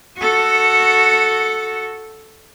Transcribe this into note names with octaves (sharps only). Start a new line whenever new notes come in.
F#4 A4